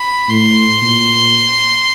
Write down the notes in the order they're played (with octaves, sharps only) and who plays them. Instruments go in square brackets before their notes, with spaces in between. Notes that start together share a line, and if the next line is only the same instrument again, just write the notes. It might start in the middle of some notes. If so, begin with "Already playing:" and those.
Already playing: [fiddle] B5
[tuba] A2 [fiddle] C6
[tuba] A#2